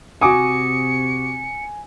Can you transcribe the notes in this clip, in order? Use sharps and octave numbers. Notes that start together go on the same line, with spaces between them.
C3 F#4 G#5 D6 D#6 C#7